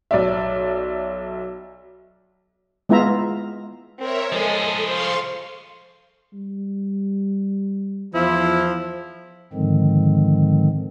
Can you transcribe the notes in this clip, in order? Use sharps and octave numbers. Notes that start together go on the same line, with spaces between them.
B1 D5 E5
G#3 B3 E4 F4 E5 A#5
C4 A#4 C#5 E5
F3 G#3 G#4 A4
C5 F5 C6 C#6
G3
E2 F3 E4
G#2 D3 D#3 F3 G#3 C4